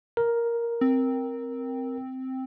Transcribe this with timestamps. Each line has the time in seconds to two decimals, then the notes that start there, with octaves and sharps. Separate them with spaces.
0.17 A#4
0.81 C4